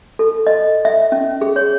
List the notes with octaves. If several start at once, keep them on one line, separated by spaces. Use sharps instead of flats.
A4
D#5
E5
C#4
G#4
C#5